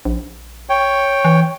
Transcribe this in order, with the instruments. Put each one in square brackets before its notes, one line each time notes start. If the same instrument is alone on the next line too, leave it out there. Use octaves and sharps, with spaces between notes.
[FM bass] A#1
[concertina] C#5 G5
[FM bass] E3